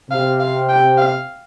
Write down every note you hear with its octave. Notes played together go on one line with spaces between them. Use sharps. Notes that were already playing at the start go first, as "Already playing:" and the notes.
C3 F5
F5
G5
F5